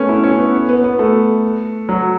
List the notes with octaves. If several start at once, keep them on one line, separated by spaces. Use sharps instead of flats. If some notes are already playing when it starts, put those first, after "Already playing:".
Already playing: A3 B3 C#4
E4
C#4
B3
B3
B3
A3
F#3